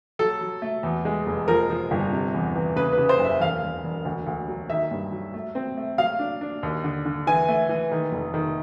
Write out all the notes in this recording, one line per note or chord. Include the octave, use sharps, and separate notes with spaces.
F#3 A4
F#3
A3
E2
G#3
F1
F3 A#4
F3
G1
C3
E2
E3
C#3 B4
B4
C#3
C5
F#1 E5
E1 F5
E1
E1
D2
D2
F#3
D#3 E5
G2
F#3
A3
C4
A3
F#3 F5
D4
D4
D#2
D3
D3
E3 G#5
A3
E3
D#3
F1
D#3